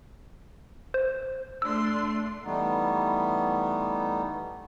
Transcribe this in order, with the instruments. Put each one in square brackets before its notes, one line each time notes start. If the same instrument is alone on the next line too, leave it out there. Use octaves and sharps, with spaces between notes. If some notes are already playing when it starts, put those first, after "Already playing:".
[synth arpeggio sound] C5
[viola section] A3 D4 C6 [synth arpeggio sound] E6
[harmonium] E3 G3 A3 B3 D#4